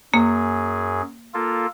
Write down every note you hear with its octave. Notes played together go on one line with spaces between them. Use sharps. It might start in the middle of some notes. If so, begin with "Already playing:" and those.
F#2 A#3 G#4
A#3 F4 A4